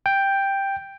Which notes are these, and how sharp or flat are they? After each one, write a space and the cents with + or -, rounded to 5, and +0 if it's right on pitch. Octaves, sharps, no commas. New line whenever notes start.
G5 +5